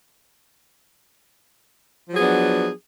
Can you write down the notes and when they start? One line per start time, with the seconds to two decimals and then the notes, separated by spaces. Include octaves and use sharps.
2.08 F3
2.12 F#3
2.16 G#4
2.19 B3
2.23 D4